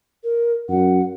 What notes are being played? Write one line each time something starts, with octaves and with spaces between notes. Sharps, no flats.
A#4
F#2 F#5